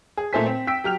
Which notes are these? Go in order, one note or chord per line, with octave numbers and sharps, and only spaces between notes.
G#4
A#2 A3 A4 C5 G#5 B6
C4
G5 E6 B6 D7
F#3 G4 F6 F7